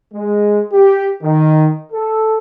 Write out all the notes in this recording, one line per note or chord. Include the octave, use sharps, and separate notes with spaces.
G#3
G4
D#3
A4